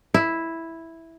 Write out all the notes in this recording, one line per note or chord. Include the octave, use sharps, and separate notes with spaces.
E4